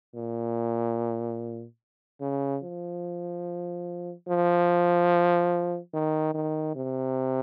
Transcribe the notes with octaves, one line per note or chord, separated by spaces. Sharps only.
A#2
C#3
F3
F3
D#3
D#3
C3